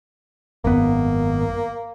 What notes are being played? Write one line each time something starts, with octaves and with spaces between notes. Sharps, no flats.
G#1 F#2 A#3 B3